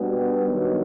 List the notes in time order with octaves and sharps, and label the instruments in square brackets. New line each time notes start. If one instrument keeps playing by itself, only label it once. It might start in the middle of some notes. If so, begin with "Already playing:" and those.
Already playing: [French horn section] B2 G3 B3 D4
G2 D#3 F#3 B3